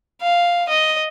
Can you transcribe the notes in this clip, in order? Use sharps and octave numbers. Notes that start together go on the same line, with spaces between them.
F5
D#5